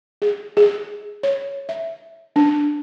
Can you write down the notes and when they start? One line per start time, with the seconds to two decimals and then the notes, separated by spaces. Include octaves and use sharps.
0.22 G#4
0.57 G#4
1.23 C#5
1.69 E5
2.36 D4